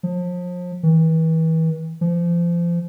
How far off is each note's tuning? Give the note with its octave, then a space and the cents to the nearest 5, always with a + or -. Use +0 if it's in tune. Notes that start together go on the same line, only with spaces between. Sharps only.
F3 +35
E3 -35
F3 -30